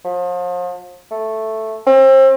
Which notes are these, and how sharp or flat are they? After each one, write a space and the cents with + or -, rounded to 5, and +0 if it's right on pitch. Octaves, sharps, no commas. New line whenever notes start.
F3 +40
A3 +0
C4 +35